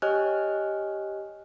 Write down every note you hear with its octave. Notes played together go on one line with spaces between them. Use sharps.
G4 C#5 D#5 G#5 F6 F#6